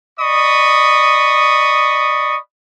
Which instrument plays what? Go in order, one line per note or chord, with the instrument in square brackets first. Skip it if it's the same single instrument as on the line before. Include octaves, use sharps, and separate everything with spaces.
[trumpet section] D5 D#5 B5 C#6 D#6